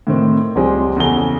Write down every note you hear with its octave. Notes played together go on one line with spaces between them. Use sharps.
A2 D#3 C4
C#2 F3 G3 G#3 C4
E2 C#3 A4 G7